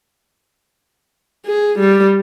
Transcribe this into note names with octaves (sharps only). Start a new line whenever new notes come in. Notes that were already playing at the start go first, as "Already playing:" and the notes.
G#4
G3